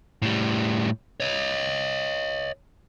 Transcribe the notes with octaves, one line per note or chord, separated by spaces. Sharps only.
A2 G3
C#5 D#5